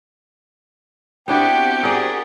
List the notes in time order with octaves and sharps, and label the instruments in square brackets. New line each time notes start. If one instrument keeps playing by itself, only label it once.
[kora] B3 D4 E4 [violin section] C4 F#4 G4 [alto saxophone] G5
[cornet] G#4 [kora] A#4 D5